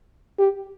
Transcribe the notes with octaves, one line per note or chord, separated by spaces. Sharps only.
G4